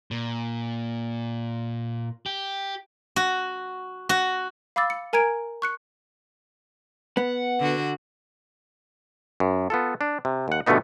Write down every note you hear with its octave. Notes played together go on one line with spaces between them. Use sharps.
A#2
G4
F#4
F#4
F5 B5 D6 E6 A6
C#7
A#4 G#5 A#5 G#6 D7
C#6 F#6 C#7
B3 F#5
D3 F#4
F#2
B3 F4 A4
D4
C3
D#2 F#5
G2 B2 D3 A3 B3 D#4